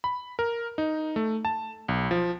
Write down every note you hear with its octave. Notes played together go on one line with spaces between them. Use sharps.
B5
A#4
D#4
A3
A5
B1
F3